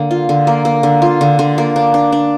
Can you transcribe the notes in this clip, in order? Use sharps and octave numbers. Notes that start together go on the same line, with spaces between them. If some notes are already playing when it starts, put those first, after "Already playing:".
Already playing: D3 A#3
F4
D3
A#3
A#3
D3
F4
D3
D3
A#3
D4
D4
D4